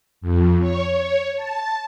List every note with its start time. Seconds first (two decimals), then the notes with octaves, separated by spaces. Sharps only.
0.21 F2
0.60 C#5
0.91 C#5
1.36 A5